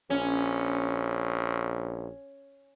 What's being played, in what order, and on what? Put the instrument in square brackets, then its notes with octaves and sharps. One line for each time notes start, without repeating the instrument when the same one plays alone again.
[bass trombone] A#1 [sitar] C#4